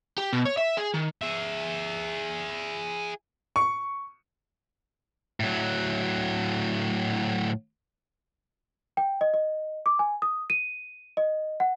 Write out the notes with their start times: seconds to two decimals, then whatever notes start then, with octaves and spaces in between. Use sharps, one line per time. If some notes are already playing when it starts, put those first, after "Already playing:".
0.18 G4
0.33 B2
0.45 C#5
0.57 E5
0.77 G#4
0.94 D#3
1.22 G#4 E5
3.56 C#6
5.40 A2 F#3
8.97 G5
9.21 D#5
9.34 D#5
9.86 D6
9.99 G#5
10.22 D#6
10.50 D#7
11.17 D#5
11.60 F#5